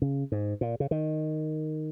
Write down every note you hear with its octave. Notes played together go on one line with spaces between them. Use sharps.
C#3
G#2
A#2
C#3
D#3